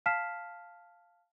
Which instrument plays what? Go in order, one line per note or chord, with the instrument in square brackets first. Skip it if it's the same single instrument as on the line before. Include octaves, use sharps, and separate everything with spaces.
[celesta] F5 A5 F6 B6 C7 E7